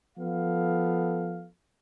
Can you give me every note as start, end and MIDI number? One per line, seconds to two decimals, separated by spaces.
0.18 1.47 53
0.18 1.47 59
0.18 1.47 69
0.18 1.47 77